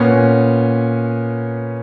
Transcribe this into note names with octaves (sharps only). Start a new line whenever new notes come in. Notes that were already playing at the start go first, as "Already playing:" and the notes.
Already playing: A#2 B3 C#4